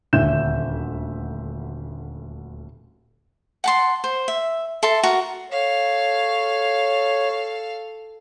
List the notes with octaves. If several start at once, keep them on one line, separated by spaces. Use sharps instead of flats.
D#1 D2 E5 G6 E7
F#5 A5 C6
C5
E5
A4 E5 A5 C6
F#4 A#4
A4 C#5 F5